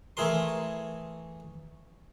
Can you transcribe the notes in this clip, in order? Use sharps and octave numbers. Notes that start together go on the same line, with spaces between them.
E3 A3 E4 G#4 A#4 C6